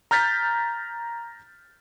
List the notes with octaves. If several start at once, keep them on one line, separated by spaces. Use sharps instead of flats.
A#5 F6 G6 A6 B6